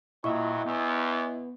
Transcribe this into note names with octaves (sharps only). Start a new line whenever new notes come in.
G2 A#2 F#3 E4 D#5 E5 C#6
E2 B3